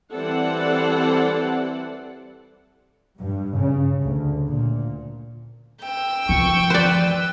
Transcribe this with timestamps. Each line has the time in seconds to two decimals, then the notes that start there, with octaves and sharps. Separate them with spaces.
0.14 E3 G3 C4 A4 D5 F#5
3.19 G2
3.58 C#3
4.03 D2
4.51 A#2
5.83 G5 E6
6.29 D#3 F3 C#6
6.70 B4 C5 D5